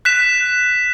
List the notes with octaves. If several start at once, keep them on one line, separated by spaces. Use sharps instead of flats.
F#6 B6 E7